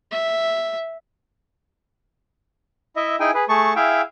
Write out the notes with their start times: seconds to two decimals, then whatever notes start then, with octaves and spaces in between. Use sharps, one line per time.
0.11 E5
2.96 E4 D#5 E5
3.20 D#4 E4 G#4 G5 G#5
3.34 G#4 B4
3.49 A3 G#4 A5 C#6
3.76 E4 G#4 E5 F5 G5